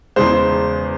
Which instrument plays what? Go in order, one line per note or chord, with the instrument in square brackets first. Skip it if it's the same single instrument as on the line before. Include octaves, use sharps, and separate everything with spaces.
[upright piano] E2 C#3 G#3 C5